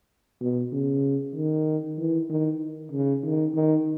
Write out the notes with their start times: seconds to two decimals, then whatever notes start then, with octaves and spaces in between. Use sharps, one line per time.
0.41 B2
0.72 C#3
1.35 D#3
1.98 E3
2.30 D#3
2.92 C#3
3.24 D#3
3.55 D#3